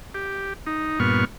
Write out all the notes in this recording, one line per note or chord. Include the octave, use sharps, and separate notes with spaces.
G4
D#4
G2 A#2 B3 C#6 F6